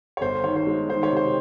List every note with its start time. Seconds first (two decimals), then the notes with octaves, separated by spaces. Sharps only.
0.17 C#5
0.21 G1 C5
0.44 D#3 C#5
0.56 C5
0.67 G#3
0.89 D#3 C5
1.03 C#5
1.12 C3 C5